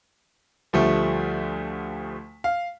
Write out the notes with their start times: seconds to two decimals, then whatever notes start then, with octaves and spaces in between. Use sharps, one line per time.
0.73 D2 F3 G3 A3
2.44 F5